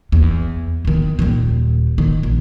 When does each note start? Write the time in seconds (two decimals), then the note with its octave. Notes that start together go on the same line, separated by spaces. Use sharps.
0.12 E2
0.85 D#3 B3
1.19 D#1 D#3
1.98 D#3
2.23 A#1